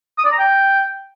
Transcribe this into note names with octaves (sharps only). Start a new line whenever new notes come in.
D#6
D5
A#5
G5